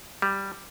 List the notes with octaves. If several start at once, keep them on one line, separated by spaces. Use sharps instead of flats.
G3